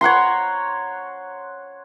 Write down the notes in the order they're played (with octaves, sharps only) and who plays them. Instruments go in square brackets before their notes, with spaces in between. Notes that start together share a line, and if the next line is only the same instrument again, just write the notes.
[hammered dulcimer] C#5 F#5 A#5 C6